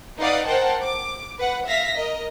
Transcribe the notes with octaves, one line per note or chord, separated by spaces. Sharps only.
D#4 B4 D5 F5 F#5 D#6
A#4 C5 F#5 G5 A5
D6
B4 F#5
E5 F5 A#6 B6
A#4 D#5